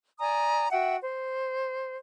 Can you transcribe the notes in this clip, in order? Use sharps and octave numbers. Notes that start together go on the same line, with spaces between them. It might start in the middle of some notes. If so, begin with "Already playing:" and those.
D5 G#5 A#5 D#6
F#4 E5 F#5 G5
C5